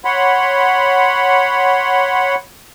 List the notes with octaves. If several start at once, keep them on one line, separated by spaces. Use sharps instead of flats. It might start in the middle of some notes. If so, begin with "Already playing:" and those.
C#5 F#5 B5 C6